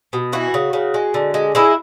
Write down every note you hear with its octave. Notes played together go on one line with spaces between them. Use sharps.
B2
E3 F#4
C#3
C#3
G#3
D3
G#3
G#3 E4